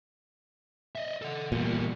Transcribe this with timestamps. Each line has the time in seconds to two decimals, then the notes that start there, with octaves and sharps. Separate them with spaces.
0.95 D#5 E5
1.22 A4 F#5
1.52 E2 A#2 G3